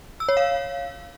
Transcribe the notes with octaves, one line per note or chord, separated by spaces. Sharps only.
E6
C#5
F5